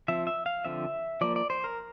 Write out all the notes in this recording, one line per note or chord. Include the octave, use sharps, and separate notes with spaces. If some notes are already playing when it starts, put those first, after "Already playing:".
F3 C4 E5
E5
F5
D3 F3 C4 E5
F3 A#3 D5
D5
C5
A#4